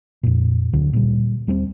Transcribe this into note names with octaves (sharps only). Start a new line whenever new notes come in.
F2 A#2
D2 D3 F#3
A#2 G3
D#2 G3 A3 C4